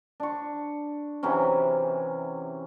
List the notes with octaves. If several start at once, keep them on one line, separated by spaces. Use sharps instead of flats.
D4 C#6
C3 E3 F#3 C#4